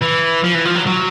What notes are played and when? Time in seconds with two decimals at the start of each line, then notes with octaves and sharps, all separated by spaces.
0.02 E3
0.44 F3
0.55 E3
0.65 F3
0.75 F#3
0.87 F#3